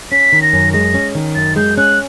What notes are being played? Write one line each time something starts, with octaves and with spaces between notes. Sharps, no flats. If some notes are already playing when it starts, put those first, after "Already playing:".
C#4 B6
D#3
A#6
F#2
G#3 A#6
C#4
D#3
F#2 A6
G#3 G6
C#4 F#6